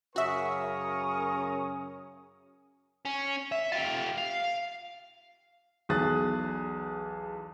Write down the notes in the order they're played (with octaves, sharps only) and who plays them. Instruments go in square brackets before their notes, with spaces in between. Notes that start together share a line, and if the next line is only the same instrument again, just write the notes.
[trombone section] F#2 C#3 C#4 [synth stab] F#4 E5 [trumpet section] A#4 C#6 D#6
[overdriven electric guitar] C#4
E5
F4 G4
F5
[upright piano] B1 E2 G#4 D#6 F#6 A6